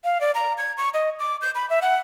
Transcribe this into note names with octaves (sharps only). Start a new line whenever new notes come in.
F5
D5
A#5
G#6
C#6
D#5
D6
G6
B5
E5
F#5